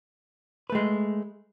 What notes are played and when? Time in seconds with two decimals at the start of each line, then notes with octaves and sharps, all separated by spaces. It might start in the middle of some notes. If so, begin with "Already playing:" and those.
0.70 B4
0.72 A3
0.75 G#3